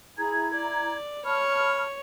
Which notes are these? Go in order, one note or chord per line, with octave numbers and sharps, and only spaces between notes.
E4 G#4 A#5 G#6
D5
C#5 A5 B5 F6